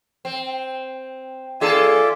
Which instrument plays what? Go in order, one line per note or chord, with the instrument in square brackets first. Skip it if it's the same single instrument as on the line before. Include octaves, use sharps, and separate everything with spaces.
[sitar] C4
[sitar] D#2 G#4 A4 [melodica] F4 D5 E5